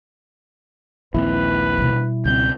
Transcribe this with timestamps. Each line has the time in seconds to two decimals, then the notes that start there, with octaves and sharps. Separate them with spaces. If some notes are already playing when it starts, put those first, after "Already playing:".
1.14 A#1 D#2 G#3 C4 E4 B4
1.78 B2 G3
2.25 C#2 F#3 C4 G6